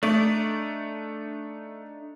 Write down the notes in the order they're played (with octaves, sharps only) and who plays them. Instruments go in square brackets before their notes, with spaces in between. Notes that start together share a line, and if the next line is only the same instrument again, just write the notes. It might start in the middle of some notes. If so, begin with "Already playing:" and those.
[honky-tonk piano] A3 [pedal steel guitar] D4 D#4 D5